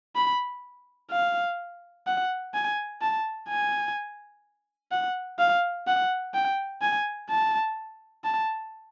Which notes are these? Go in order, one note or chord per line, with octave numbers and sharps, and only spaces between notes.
B5
F5
F#5
G#5
A5
G#5
F#5
F5
F#5
G5
G#5
A5
A5